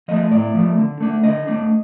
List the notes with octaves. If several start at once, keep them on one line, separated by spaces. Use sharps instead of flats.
F3 A3 D#5
A2 D5
F3 A3
D3
A3 D4
D3 D#5
A3 D4